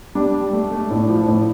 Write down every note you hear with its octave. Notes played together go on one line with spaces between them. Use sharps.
G3 D4
G3
A3
A3
A2
F3
A2